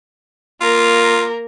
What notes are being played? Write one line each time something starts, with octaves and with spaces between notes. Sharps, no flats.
A#3 F4 A#4